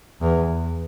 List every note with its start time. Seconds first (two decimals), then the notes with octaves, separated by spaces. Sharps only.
0.21 E2